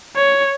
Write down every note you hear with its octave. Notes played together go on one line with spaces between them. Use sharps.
C#5